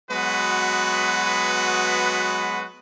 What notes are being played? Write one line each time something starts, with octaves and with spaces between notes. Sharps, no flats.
F#3 G#3 B3 F#4 B4